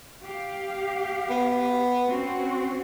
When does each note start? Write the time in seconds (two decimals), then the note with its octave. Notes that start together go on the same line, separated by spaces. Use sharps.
0.23 G4 F5
1.30 B3
2.08 C4 C#4 F#4